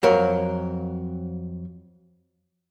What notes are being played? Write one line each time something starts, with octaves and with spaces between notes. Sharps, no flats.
F2 F#3 A#4